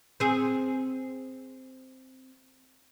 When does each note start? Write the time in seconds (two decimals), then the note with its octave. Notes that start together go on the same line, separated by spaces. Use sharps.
0.20 C4 G#4